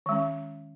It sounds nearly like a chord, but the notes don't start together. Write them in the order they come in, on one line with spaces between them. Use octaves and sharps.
D#3 G#3 C#4